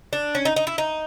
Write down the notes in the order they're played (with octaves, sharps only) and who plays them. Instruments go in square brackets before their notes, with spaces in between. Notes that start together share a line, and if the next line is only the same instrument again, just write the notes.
[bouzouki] D4
C#4
D#4
D#4
E4
D#4